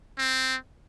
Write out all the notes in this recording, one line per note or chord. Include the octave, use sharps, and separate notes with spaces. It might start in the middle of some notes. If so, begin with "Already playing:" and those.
C4